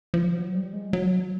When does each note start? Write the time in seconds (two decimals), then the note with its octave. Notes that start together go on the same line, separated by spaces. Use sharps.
0.14 F3
0.34 F#3
0.54 G3
0.73 G#3
0.93 F#3